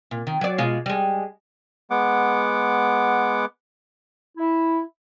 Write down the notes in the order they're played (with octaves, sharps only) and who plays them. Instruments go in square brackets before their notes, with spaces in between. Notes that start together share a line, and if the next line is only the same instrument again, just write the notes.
[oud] A#2
D#3
F#3 D5
B2 G#3 F4
G3 G#3
[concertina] G#3 B3 F#5 D6
[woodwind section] E4